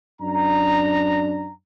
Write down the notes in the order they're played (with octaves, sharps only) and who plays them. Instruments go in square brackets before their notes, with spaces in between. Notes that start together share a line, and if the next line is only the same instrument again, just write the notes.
[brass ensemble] F#2 D4 A#5